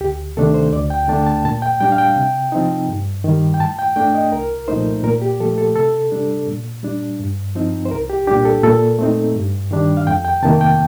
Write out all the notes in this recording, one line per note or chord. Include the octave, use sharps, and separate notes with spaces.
D2 G4
C3 D#3 A3 D4 A4
C5
D2 D5
G5
D3 A3 D4 A5
A5
A#2 A5
G5
G3 D4 G5
F5
G5
C3
F3 C4 D#4
G2
D#3 G3
G5
A2 A5
G5
A3 D4 G5
D#5
C2 A#4
A#2 F3 A3 D#4 C5
A#2 A#4
G4
F3 A3 A4
A4
C3 A4
G3 D4
A#2
G3 D4
G2
F3 C4 D#4
C5
C2 A#4
G4
A#2 G3 D4 G4
A4
A#2 A4
A3 C4 D#4
G2
D#3 G3 D4
F5
F2 G5
G5
C3 D#3 A#3 A5
G5